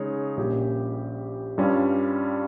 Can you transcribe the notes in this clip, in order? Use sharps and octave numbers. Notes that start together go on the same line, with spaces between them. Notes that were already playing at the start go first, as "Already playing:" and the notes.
Already playing: C#3 G#3 D#4 G#4 C#5
A#1 A#2 G3 C#4 G4
G2 G3 C#4 F4